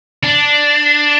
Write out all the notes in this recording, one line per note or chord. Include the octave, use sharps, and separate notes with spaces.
D4